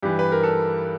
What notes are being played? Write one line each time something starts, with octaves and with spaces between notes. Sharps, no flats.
G2 E3 G4
B4
A#4
A4